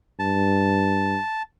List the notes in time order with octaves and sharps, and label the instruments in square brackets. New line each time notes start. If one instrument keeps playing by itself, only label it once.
[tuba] G2 [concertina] A5